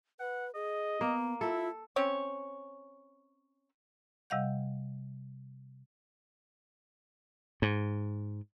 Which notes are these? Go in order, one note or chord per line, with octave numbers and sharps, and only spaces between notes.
B4 F#5
G#4 D#5
A#3 B3
E4 F4 A4
C4 C#4 C#5
C3 G3 D#5 F5 F#5 G6
G#2